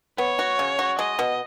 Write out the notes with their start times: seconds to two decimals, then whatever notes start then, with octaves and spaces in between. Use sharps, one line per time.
0.18 B3 C#5
0.39 F#4
0.59 C#3
0.79 F#4
0.99 G#3 D#5
1.19 B2